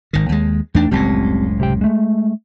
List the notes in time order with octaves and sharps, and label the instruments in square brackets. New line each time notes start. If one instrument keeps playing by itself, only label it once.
[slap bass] G#1 D#3
D#2 G#3
[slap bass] E2 D4 [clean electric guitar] A3 D#4 G5
[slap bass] F#1 C#2 A2 [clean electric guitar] G3 C4 A5
[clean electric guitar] C3 G4 G5
G#3 A3